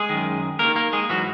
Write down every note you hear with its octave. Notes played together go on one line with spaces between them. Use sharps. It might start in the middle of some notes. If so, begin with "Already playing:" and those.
Already playing: G#3 G#4
F#2 D#3
D#2 D#3 A#3 A#4
A#3 A#4
G#3 G#4
G#2 E3 F#3 F#4